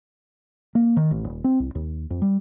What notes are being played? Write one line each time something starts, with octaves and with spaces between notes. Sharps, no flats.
A#3
D#3
A1
D#1
C4
C2
D#2
F2
G3